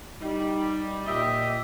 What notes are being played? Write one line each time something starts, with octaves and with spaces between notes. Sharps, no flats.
G3 D#4
A#2 G4 D#5 E5